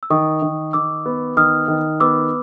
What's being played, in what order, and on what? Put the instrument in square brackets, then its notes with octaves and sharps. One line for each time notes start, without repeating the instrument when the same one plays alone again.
[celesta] E6
[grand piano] D#3 [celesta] C#6 D#6
[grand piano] D#3
[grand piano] D#3 [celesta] D6 E6
[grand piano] B3
[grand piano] D#3 [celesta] D#6 F6
[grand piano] D#3
[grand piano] B3 [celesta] D6 E6